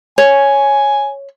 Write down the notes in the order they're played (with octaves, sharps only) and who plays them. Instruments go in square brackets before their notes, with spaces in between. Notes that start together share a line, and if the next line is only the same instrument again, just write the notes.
[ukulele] C#5 [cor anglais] G#5